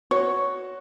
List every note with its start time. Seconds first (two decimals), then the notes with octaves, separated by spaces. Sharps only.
0.11 F#4 C#5